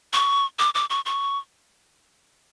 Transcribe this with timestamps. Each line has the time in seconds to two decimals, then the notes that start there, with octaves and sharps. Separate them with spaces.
0.13 C#6
0.59 D6
0.75 D6
0.90 C#6
1.06 C#6